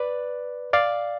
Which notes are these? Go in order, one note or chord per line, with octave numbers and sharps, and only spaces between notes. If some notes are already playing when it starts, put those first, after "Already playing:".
Already playing: B4 D5
D5 F5